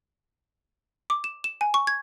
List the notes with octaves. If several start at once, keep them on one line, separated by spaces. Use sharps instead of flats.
D6
E7
E7
G#5
C#6
G#6